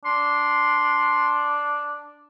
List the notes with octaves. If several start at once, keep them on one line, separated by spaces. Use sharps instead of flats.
D4 C6